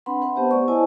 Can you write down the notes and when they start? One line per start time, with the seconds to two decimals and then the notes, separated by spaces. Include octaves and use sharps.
0.06 C4 D4 B4 F#5 B5 C6
0.22 B4 E5 F#5 B5
0.36 B3 G4 C5 A5
0.51 A3 D5 C#6
0.68 E4 C5 C#5 D#5 G#5 A5